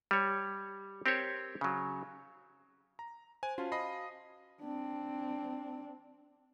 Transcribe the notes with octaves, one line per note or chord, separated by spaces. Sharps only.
G3 C#5
C4 G4 A#4 C5 C#5
C#3 F#3
A#5
C5 G#5
C#4 F4 F#4 F5 A5
D#5 B5 C7
C4 D4